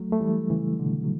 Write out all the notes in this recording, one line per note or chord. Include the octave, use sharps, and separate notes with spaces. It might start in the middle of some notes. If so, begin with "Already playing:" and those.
Already playing: F#3 A3
A3
E3 G3
C#3 E3
B2 D3
F#3